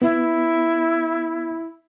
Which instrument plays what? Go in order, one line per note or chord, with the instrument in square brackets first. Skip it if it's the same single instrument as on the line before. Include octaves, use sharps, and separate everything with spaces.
[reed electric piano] B3 [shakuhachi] E4